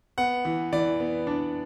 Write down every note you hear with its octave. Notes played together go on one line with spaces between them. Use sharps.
B3 F#5
E3
E3 D5
B3
D4